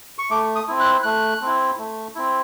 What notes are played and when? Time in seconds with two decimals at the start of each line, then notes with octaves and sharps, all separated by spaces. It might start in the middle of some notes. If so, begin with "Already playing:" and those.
0.19 C#6
0.30 A3 D6
0.56 D#6
0.68 C4 E4
0.80 F#6
1.03 A3 F#6
1.41 C4 E4
1.78 A3
2.15 C4 E4